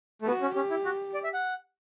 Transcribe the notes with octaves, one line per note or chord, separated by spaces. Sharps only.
A3
B3 F#4
C#4
C#4 G4
E4
F#4
D5
E5
F#5